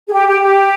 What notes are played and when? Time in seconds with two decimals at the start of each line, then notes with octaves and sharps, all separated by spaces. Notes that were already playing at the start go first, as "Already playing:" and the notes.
0.07 G#4
0.13 G4
0.27 G4
0.42 G4